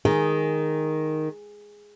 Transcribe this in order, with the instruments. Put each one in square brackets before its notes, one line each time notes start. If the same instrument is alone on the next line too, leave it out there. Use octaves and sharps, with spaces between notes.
[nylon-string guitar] D#3 [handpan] G#4